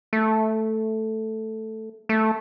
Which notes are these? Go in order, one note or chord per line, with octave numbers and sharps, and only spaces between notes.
A3
A3